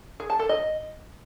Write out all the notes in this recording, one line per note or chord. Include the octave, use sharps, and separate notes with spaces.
G#4
A5
A4
D#5